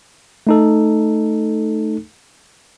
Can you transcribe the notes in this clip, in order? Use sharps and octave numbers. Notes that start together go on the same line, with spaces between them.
A3 D#4 A4